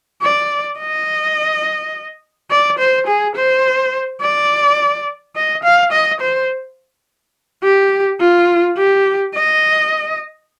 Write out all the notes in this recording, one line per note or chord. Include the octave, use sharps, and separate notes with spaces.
D5
D#5
D5
C5
G#4
C5
D5
D#5
F5
D#5
C5
G4
F4
G4
D#5